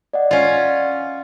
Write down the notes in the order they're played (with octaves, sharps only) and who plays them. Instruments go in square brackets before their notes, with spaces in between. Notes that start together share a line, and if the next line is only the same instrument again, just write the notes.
[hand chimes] D5 D#5 F#5
[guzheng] C#4 F4